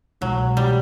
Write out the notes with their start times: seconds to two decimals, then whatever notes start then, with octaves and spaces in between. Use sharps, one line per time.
0.21 C2 B2 F#3 G#3
0.57 G3